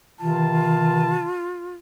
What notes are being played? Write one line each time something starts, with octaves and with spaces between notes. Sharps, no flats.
C3 D#3 E3 F4 A5